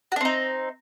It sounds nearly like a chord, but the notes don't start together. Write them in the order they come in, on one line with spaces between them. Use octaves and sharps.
F#4 D4 C4 D#4